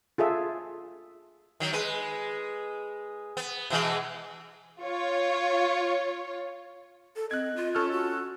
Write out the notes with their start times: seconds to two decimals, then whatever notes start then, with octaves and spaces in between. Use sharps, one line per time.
0.18 F4 G#4 A4 E5
1.60 D#3 F#3
1.73 G#3 B4
3.37 B3
3.70 B2 E3 G#3
4.81 F4 C#5
7.16 A4
7.31 C4 D#5 F#6 G#6
7.56 F4
7.75 C#4 A4 C#6 F6
7.91 F#4